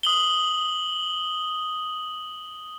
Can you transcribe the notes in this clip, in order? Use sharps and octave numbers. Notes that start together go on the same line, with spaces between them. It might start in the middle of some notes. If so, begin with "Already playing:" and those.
D#6 F#7 G7